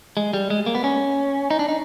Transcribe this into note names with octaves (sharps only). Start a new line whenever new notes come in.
G#3
G3
G#3
A#3
B3
C#4
D#4
D4
D#4